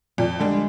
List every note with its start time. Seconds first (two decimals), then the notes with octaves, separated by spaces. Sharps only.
0.18 F2 A#2
0.39 D3 G3 G#3 D4